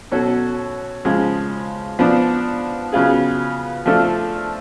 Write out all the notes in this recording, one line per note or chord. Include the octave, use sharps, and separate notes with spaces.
B2 F#3 C#4 F#4 A4
C#3 F3 G#3
F3 B3 D4
C#3 F#3 B3 F4 G#4
F3 A3 D4 F4 A4